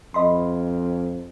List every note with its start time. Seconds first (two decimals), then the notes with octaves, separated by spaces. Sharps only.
0.14 F2 D#5 B5 C6